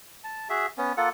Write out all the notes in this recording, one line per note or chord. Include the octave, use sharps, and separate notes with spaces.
A5
F#4 G#4 E5
B3 C#4
A#3 F4 A4 F#5